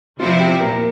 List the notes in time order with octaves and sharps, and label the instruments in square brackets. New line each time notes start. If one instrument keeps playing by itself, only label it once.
[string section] E2 C3 F3 C4 E4 [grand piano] F4
[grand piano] G4
[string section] A#2 [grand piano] A#4